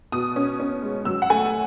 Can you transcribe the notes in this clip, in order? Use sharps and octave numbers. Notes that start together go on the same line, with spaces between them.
B2 D#6
C#4
C#4
G#3
F#3 E6
F#5
A3 G#5